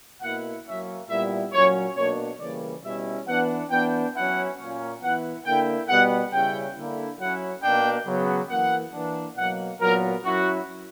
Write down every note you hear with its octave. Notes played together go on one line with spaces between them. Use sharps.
B2 A#3 E4 F#5
F#3 A#3 C#4 E5
A#2 G3 B3 E4 E5
A#2 F#3 C#4 C#5
B2 A#3 D4 C#5
C#3 E3 G3 A#3 D5
B2 G3 C#4 E4 E5
E3 B3 D4 F#5
E3 B3 D4 G5
F#3 C#4 E4 F#5
A#2 A#3 C#4
E3 B3 E4 F#5
D3 A#3 E4 G5
B2 G3 B3 F#5
C#3 G3 C#4 E4 G5
D3 A#3 E4
F#3 C#4 E4 F#5
B2 A#3 D4 G5
C#3 F#3 B3
E3 A#3 E4 F#5
E3 A#3 D4
B2 F#3 A#3 F#5
A#2 F#3 B3 A#4
F#3 C#4 E4 F#4